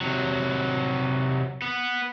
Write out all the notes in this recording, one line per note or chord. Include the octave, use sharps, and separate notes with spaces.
C3 F#3
B3